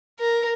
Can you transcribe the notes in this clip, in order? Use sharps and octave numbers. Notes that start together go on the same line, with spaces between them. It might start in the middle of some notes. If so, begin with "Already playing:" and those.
A#4